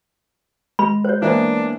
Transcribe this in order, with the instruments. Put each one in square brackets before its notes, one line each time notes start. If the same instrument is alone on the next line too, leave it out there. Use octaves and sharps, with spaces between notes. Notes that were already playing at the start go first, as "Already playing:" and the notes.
[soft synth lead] G#3 [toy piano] B5
[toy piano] C5 C#5
[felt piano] E3 A#3 B3 [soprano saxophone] D4 [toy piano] C5